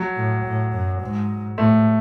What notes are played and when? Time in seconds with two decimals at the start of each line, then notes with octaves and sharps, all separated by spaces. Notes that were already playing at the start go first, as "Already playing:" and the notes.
Already playing: F#3
0.16 A2
0.45 A2
0.72 F#2
1.02 G#2
1.58 A2 A3